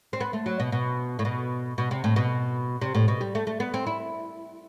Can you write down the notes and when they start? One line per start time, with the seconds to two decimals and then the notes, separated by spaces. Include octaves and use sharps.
0.13 C4
0.20 B3
0.33 A3
0.46 F#3
0.60 B2
0.72 B2
1.19 A2
1.25 B2
1.78 B2
1.91 C3
2.04 A2
2.16 B2
2.81 C3
2.95 A2
3.08 B2
3.21 G3
3.35 A3
3.47 A3
3.60 B3
3.74 C4
3.87 E4